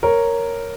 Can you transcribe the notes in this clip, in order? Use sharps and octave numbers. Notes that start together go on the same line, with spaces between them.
A#4 C#5